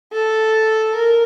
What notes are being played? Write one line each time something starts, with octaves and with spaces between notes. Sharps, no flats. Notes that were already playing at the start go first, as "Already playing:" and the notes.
A4
A#4